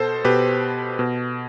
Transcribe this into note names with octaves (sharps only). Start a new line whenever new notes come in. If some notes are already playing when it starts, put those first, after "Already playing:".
Already playing: B2 A4 C5
B2 G4 B4
B2